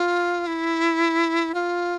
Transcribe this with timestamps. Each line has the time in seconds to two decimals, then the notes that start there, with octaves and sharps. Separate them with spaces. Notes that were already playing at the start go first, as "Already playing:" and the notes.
Already playing: F4
0.47 E4
1.54 F4